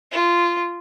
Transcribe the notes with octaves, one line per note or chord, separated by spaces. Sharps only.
F4